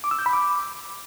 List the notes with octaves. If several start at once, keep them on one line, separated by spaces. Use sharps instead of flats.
D6
E6
G6
B5
D6